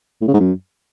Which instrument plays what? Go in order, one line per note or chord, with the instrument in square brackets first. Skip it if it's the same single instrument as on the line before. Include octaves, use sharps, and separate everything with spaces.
[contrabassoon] A2
C#3
G#2
F#2